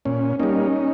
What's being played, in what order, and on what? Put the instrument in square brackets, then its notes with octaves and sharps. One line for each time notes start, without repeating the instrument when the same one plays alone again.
[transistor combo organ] A#2 C#4
G3 A#3 C#4 D#4